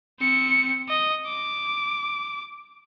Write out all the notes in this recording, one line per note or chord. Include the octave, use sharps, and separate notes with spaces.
C4 C#7
D#5
D6